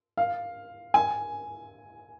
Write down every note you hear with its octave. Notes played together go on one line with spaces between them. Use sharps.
F5
G#5